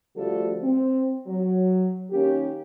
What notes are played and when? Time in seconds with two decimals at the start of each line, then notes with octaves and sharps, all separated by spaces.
0.15 D3 F3 G3 A3 F#4 A4
0.62 C4
1.27 F#3
2.11 D#3 A#3 C#4 G4